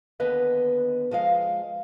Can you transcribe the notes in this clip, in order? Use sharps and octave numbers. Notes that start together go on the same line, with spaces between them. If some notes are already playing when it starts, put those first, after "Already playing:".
D#2 D3 B3 B4 D#5
F3 G#3 D#5 F5